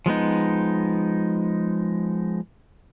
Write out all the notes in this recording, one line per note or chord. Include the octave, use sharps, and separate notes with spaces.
F3 G#3 B3 D#4